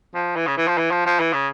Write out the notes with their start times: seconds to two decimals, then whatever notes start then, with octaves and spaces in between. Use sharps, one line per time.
0.15 F3
0.36 E3
0.47 C#3
0.57 E3
0.68 F3
0.77 E3
0.91 F3
1.06 F3
1.19 E3
1.33 C#3